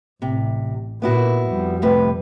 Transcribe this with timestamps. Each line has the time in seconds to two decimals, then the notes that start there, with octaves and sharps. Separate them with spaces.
0.22 A1 C3
1.02 A#2 B3 E4 F#4
1.48 F2 G3
1.82 A2 C3 B4